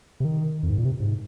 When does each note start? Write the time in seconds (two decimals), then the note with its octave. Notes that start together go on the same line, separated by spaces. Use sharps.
0.20 C3
0.25 D#3
0.63 F2
0.70 G#2
0.78 A#2
0.85 C3
1.00 G#2